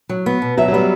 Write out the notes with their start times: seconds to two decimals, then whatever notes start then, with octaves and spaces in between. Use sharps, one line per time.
0.09 F#3
0.26 B3
0.42 B2
0.57 F#3 E5
0.68 F#3
0.73 G3 B3